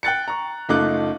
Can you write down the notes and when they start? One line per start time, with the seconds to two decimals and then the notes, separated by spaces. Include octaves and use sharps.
0.03 G5 F#6 A6 C#7
0.28 A#5 C#6
0.69 F#1 A3 D#4 F4 D6 F#6